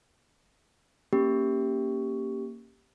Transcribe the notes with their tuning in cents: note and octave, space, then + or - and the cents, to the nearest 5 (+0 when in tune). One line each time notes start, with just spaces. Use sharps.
A#3 +0 C#4 -10 G4 +0